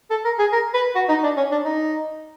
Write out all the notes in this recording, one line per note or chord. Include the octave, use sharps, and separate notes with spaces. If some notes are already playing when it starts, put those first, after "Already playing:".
A4
A#4
G#4
A#4
B4
F#4
D#4
D4
C#4
D4
D#4